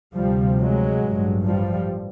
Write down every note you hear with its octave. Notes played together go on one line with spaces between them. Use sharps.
D2 C3 F3 G3
F#3 G#3
A1 G2
F3 G3